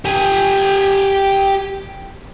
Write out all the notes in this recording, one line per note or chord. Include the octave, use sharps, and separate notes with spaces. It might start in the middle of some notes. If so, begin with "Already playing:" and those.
G4 G#5